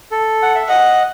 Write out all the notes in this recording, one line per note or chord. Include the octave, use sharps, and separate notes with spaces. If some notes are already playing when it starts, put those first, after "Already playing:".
A4
F#5
E5
D#5 F#5